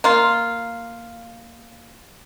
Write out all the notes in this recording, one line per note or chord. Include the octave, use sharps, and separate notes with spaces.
A#3 F4